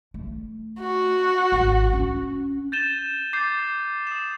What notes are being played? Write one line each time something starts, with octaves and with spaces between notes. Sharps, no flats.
A3
F#4
G#1
C#4
G6 A6 D#7 E7 G7
D6 G6 A6 C7
D#6 C7 E7